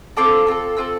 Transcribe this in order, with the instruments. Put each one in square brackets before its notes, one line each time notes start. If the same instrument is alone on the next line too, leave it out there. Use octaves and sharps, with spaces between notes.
[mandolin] C4 F4 A4 D6
C4 F4 A4
C4 F4 A4 E6